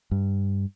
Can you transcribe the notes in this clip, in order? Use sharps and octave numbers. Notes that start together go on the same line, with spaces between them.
G2